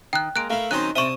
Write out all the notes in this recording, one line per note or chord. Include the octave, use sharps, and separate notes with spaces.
D#3 G5 F#6
G#3 A#3 F#6 D7
A3 E4 A#4 F5
D#3 F#3 C4 C#4 D#4 C5 F#6
C2 C4 C5 D5 E5 A5 C#6 D#6